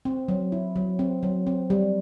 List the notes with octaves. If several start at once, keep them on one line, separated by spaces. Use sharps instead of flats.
C4
F#3
E4
F#3
C4
F#3
C4
G3